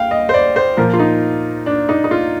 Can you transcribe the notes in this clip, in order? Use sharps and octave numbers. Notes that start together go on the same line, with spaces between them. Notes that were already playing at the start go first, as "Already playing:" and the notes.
Already playing: F5 G5
D#5
C5
D5
C5
A#2 F3 A#4
F4
D#4
D4
D#4
D#4
F4